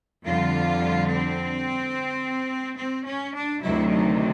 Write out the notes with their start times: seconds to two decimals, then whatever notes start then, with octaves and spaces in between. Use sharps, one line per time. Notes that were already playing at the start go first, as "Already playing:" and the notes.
0.24 F2 D3 G3 F4
1.08 C4
2.78 C4
3.06 C#4
3.35 D4
3.63 D2 C3 D#3 F#3 E4
3.91 D#4